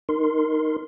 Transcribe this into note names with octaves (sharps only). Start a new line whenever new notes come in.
D#4 A#4 C6